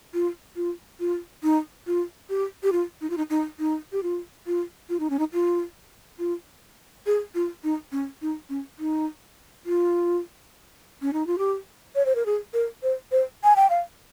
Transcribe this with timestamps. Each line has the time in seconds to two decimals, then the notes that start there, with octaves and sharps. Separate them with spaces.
0.14 F4
0.56 F4
1.00 F4
1.43 D#4
1.87 F4
2.30 G4
2.63 G4
2.72 F4
3.01 D#4
3.10 F4
3.17 D#4
3.30 D#4
3.59 D#4
3.92 G4
4.03 F4
4.47 F4
4.89 F4
5.00 D#4
5.10 C#4
5.19 D#4
5.33 F4
6.19 F4
7.06 G#4
7.35 F4
7.64 D#4
7.92 C#4
8.22 D#4
8.49 C#4
8.79 D#4
9.66 F4
11.02 C#4
11.13 D#4
11.27 F4
11.38 G4
11.95 C#5
12.06 C5
12.15 A#4
12.26 G#4
12.53 A#4
12.83 C5
13.12 C5
13.44 G#5
13.56 G5
13.70 F5